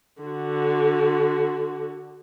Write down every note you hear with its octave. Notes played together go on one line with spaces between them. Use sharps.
D3 F#4